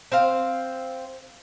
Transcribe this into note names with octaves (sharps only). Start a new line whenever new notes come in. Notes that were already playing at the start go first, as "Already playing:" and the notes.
C4 C5 F5